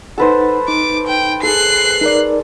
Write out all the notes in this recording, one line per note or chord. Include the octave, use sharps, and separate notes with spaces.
D#4 A4 B4 C5 F#5
D#4 D6
G5
G#4 A4 F#6 C7
D#4 A#4 D5